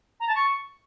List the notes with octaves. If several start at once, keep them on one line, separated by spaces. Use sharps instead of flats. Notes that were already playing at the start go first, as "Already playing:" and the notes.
A#5
A5
C#6